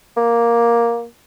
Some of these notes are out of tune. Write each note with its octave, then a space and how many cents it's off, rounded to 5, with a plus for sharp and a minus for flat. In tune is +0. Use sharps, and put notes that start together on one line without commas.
A#3 +5